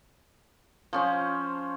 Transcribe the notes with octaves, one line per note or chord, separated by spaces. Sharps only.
F3 C#4 C5